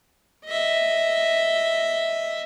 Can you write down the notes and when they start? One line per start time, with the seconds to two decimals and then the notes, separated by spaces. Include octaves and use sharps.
0.46 D#5 E5